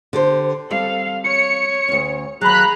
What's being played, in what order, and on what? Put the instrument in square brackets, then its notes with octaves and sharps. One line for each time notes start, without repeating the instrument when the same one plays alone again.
[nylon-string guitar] D3 G4 C5
[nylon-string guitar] G3 C4 [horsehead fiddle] A4 F5
[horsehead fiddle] C#5 [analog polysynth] C#7
[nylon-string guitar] D2 C#4
[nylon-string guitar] D#2 F#3 [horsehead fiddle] G#4 A#5 [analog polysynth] B5 F#6